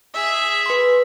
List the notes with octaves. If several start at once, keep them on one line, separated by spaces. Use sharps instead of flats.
G#4 E5
B4 C6